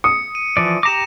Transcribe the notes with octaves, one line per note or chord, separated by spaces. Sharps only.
D#6 C#7
D#7
E3 F3 D5
G4 A#5 D6 A#6 E7